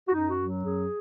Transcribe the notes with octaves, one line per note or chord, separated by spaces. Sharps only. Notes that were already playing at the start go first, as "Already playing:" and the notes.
F#4
F#2 D#4
F#4
F#3
F#2 G#4